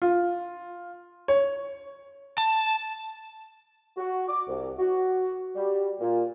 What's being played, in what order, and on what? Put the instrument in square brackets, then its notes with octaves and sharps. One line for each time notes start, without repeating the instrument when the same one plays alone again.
[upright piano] F4
C#5
[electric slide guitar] A5
[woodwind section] F#4
D6
C2
F#4
G3
A#2